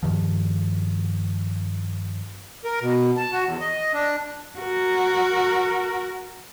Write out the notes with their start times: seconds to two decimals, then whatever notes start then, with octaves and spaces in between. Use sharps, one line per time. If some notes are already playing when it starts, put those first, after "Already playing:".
0.03 G2 D#3 F3
2.64 A#4
2.81 B2
3.17 A5
3.33 F#4
3.44 E2
3.60 D#5
3.94 D4
4.59 F#4 A#4